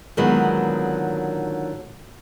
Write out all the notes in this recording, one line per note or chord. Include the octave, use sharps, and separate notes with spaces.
A#2 D3 D#3 F#3 G#3 B3